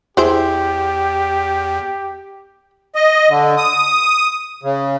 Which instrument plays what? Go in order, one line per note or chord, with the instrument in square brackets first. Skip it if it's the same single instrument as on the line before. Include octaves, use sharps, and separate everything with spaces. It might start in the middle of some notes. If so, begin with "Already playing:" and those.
[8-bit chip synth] E2 [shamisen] E4 G#4 C5 [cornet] G4
[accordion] D#5
D3
D#6
C#3